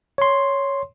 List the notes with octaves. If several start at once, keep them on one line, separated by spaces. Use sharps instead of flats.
C#5 C6